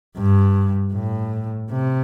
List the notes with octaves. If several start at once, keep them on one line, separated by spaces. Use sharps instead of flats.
G2
A2
C3